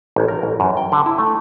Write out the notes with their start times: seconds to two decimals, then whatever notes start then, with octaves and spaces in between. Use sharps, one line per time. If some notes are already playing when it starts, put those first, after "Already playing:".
0.16 A1
0.28 A#4
0.43 A1
0.60 F#2
0.77 G5
0.92 D3
1.06 E4
1.18 A3